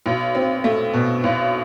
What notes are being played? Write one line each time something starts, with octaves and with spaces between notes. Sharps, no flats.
B1
C4
A3
B2
B1